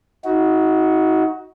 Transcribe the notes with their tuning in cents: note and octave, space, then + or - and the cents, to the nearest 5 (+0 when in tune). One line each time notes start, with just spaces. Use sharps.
D#4 +30 F#4 +0